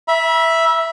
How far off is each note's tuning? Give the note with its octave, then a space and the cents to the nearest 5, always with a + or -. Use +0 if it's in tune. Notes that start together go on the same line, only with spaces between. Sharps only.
E5 +0 B5 -40